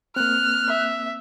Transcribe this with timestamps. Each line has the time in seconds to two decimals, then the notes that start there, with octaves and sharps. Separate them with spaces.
0.16 A#3 C4 F6 F#6
0.68 E5